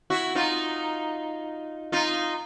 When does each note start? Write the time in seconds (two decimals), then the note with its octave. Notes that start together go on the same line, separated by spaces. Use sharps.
0.10 E4 F#4
0.35 D#4 F4
1.92 D#4 F4